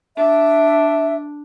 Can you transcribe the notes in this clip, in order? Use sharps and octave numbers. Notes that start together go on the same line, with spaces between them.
D4 E5